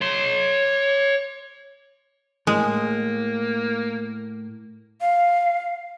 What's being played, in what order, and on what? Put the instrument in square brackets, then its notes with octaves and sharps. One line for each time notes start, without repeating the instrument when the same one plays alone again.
[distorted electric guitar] C#5 C6
[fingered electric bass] A2 [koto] G#3 [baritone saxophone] A#3
[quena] F5